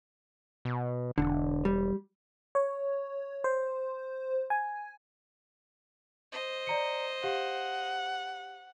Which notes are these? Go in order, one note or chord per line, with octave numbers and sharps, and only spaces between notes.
B2
E1 D3
G3
C#5
C5
G#5
C5 D#5
D5 A#5 C#7
G4 F5 F#5